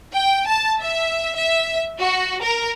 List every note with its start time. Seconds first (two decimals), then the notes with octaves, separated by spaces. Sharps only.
0.13 G5
0.47 A5
0.80 E5
1.37 E5
1.99 F#4
2.43 A#4